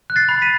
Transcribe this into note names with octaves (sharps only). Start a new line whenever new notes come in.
F#6
A6 C7
B5
B6 D#7